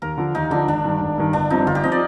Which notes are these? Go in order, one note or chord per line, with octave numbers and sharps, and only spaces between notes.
D#2 A#4
D3 F3
D#2 D#4
D3 F3 D4
G#1 D4
G2 D#3
G#1
G2 D#3
G1 D4
G2 F3 C4 D#4
G1 F4
G4
F3 C4 D#5
D5